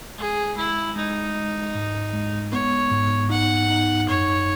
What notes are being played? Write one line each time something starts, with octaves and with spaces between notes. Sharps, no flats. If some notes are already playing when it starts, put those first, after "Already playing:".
G#3 G#4
G#3 E4
G#3 D#4
G#3
G#2
G#3
B3 C#5
G#2
D#4 F#5
D#4
F#2 C#5